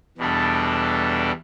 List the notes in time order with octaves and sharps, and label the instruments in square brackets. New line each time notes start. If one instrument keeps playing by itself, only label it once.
[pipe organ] E2 B2 G3 D4 A4